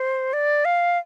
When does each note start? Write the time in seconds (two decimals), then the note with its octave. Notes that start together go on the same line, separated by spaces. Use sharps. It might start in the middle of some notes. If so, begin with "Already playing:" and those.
Already playing: C5
0.33 D5
0.65 F5